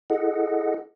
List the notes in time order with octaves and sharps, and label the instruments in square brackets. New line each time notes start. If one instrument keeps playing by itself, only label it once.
[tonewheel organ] E4 G#4 A4 D#5 F#5